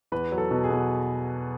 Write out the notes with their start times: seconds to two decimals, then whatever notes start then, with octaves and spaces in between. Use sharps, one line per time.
0.12 E2 B4
0.32 F#3
0.38 A4
0.51 B2
0.64 G#4
0.70 B2